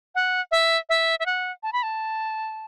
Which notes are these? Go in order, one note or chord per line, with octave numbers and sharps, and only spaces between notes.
F#5
E5
E5
E5
F#5
A5
B5
A5